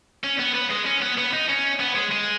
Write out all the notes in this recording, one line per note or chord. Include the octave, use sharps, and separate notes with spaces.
C#4
B3
B3
G#3
C#4
B3
B3
D#4
C#4
B3
G#3
G#3